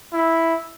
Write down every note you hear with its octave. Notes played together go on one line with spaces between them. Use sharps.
E4